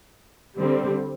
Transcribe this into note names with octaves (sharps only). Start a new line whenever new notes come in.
D3 G3 C4